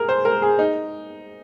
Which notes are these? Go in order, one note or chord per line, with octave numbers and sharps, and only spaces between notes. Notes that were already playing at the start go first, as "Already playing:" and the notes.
Already playing: G#4 A#4
C5
A#4
G#4
D#4